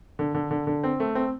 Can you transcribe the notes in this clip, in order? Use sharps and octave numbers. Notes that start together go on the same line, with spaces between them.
D3
D3
D3
D3
C4
A3
C4